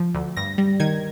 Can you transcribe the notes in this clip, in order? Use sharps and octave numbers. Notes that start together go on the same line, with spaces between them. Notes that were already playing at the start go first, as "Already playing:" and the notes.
Already playing: F3
D2
G2 A#6
G3
D#3 G#6